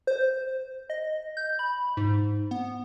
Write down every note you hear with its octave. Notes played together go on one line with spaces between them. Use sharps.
C5
D#5
G6
B5
G#2
B3